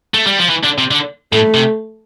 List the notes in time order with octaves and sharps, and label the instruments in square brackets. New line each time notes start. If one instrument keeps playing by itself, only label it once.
[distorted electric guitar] A3
G3
F3
E3
D3
C3
D3
[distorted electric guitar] A2 [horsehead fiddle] A3
[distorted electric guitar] C3